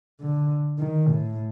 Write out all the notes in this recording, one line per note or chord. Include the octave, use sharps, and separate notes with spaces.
D3
D#3
A2